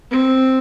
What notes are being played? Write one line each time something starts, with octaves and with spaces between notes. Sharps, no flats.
C4